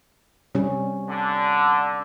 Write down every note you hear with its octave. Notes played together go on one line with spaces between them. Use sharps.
C3 G3 C#4
D3